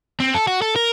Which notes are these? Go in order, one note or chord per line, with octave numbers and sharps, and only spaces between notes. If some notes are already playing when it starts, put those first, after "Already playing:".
C4
A4
F#4
A4
A#4